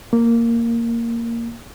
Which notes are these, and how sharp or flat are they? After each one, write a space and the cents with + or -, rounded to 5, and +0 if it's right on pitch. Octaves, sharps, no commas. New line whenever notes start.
A#3 -10